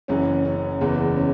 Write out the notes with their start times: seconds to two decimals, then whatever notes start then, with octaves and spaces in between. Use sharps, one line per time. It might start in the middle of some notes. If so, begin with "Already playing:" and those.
0.08 F#1 F#2 E3 C#4
0.45 C#4
0.81 F#1 E2 C#3 E3 B3
1.17 C#4